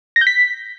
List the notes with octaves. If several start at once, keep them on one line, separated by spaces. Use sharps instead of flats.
A#6
G6
B6